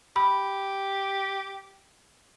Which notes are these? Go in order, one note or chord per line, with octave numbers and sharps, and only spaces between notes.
G4 B5